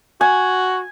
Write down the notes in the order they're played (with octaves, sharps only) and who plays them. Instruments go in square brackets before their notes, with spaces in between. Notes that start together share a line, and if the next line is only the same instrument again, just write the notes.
[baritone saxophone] F#4 [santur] G#5